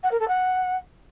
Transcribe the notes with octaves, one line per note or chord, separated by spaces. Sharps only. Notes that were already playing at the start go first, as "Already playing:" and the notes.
F#5
A#4
A4
F#5